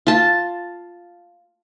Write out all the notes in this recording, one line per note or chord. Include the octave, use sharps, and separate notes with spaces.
F4 A5